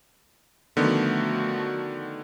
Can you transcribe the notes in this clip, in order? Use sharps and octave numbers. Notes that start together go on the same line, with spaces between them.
D3 D#3 F3 A3 B3 F#4